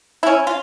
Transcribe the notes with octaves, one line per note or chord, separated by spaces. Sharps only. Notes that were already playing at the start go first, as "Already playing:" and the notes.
E4
C#4
F4